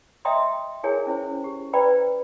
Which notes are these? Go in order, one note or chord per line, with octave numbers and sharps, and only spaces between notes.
D#5 E5 G5 A#5 C6 D#6
E4 F#4 G#4 A#4 C#5 G#5
C#4 E4 C5
G4
B4 C5 D5 G5 A#5 B5